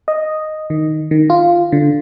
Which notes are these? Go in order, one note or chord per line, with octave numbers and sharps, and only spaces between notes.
D#5
D#3
D#3
F4
D3